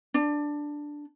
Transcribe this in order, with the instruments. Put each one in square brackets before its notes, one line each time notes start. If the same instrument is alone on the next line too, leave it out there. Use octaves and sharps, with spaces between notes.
[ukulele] D4